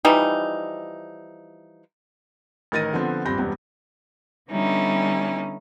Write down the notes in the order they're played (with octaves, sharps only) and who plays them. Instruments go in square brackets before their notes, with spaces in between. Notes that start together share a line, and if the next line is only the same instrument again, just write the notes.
[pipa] E3 F3 G3 D#4
[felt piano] A1 D#3 A#4 A6 A#6 D#7
D3 F3 B3 C4
D#1 G2 C4 B5 G6 A#6
E1 G2 C3 B3
[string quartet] D3 G3 B3 C#4 D#4 E4